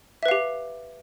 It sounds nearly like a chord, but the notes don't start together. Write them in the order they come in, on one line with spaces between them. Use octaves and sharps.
E5 B4 F5 G4